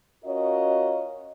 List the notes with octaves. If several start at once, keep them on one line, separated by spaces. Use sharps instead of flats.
C#4 F4 F#4 A#4 C#5 D#5